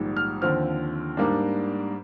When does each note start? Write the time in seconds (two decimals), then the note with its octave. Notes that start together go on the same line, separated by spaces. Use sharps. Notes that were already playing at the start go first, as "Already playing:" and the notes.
Already playing: A#1 G#2 D#3 G3
0.17 F6
0.42 D#2 D3 F3 C4 F6
1.17 G#2 G3 A#3 D4